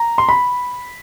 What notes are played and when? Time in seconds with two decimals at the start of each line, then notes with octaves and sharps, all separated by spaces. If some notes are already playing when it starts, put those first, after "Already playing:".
Already playing: A#5
0.18 C6
0.29 B5